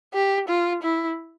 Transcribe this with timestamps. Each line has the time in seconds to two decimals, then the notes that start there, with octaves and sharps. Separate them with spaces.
0.14 G4
0.49 F4
0.82 E4